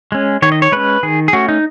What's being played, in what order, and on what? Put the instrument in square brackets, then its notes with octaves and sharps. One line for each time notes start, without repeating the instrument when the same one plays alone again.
[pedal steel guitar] G#3 C#4
D#3 C#5
D#5
C#5
G#3 C#4 B4
D#3 G#4
G#4
A3 C#4 F#4
D#4